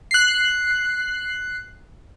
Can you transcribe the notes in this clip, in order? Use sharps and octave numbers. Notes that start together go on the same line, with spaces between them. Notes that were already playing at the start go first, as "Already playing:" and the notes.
F#6 C7